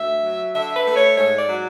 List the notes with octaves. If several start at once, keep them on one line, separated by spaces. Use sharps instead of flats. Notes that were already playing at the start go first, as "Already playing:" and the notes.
Already playing: D2 E5
F#3
D3 E5
B4
A3
C#5
G#2 C#5
D5
F#3